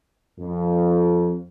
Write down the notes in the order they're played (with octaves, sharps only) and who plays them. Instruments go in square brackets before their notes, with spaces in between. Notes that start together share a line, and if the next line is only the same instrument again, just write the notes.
[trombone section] F2